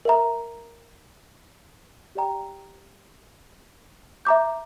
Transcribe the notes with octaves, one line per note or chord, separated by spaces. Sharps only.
A#4 E5 A#5
G4 D5 G5 A#5
E5 A#5 D6 G6